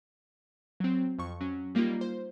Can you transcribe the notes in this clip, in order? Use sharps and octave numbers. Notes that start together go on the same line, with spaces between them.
F#3 C4
F2 C#6
F#3 C#4
G3 A#3 D#4 F4
C5